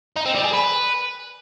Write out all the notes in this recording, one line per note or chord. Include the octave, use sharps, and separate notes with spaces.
D#4
C4
G3
G#4
B4